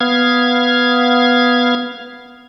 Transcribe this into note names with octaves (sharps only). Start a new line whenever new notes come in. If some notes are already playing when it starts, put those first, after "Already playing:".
B3 F5 G#6